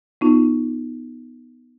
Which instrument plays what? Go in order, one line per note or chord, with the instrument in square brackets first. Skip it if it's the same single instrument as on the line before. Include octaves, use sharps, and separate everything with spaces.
[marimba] B3 D#4 F4